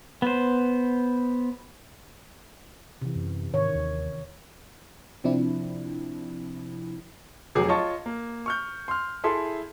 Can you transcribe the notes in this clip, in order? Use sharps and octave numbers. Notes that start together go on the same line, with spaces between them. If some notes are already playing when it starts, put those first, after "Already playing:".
B3 C5
C3 E3
F#2
G#2 D#3 C#5
D#2
C3 F3 C4 D4 E4
F1 F#3 G#4 D6
F4 C#5 D#5 A5 C#6
A#3
C#6 F6 G6
C6 F6
E4 G#4 A4 E5 C6